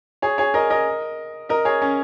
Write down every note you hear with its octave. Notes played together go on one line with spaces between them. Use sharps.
G#4 C#5
G#4 C#5
A#4 D#5
A#4 D#5
A#4 D#5
G#4 C#5
C#4